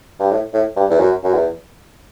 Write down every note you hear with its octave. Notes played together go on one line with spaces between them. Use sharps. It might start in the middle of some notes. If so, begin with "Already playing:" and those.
G2
A2
A2
G2
E2
F#2
F#2
E2